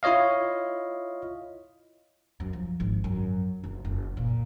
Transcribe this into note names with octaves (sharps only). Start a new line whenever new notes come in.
E4 F4 C#5 D#5 F5
F#2
F3
G#1
F#2
F#1
F#1
A#2